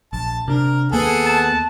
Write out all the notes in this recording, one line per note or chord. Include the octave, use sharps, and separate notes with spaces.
A#1 A5
C3 D4 A#4
D#2 A#3 B3 G#4 A4 F#5
A5